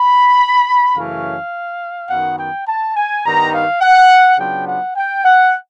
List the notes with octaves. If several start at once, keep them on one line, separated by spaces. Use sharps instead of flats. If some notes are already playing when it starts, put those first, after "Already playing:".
Already playing: B5
F#2 C#3 E3 A3 C#4 F5
F#2 D#3 F#3 B3 F#5
G5
A5
G#5
G2 D#3 G3 B3 D#4 A#5
F5
F#5
C#3 F#3 B3 D4 F4 G5
F#5
G5
F#5